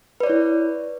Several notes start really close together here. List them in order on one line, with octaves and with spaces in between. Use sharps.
B4 D5 C#5 E4